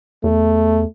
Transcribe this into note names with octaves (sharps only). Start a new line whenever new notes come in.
E2 A3